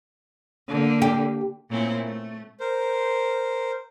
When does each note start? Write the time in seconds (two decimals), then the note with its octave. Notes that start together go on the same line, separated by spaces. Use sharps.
0.68 D3 A#3
1.02 G4
1.70 A#2 A3 A#3 C4 C#4 E4
2.06 A3
2.60 A#4 C5